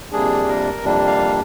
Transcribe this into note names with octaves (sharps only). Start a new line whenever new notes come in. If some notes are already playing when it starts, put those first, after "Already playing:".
F2 C3 G3 A#3 D4 G#4
A#4
F2 C3 G3 A#3 D4
F5